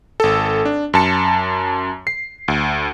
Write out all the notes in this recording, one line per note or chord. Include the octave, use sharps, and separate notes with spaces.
G#1 A4
D4
F#2 A5 C#7
C7
D2